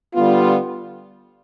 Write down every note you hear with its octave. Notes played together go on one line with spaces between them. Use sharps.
D3 G3 B3 F4